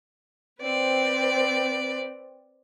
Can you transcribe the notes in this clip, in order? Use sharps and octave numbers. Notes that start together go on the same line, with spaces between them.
C4 B4 D5